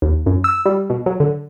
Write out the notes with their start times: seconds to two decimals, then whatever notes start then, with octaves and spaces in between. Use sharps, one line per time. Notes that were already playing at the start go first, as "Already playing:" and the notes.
0.02 D#2
0.26 F#2
0.44 E6
0.65 G3
0.90 B2
1.06 F#3
1.20 D3